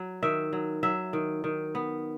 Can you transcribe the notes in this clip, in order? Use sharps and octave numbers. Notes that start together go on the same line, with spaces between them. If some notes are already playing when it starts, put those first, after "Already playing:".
Already playing: F#3
D#3 E5
F#3
F#3 E5
D#3
D#3
B3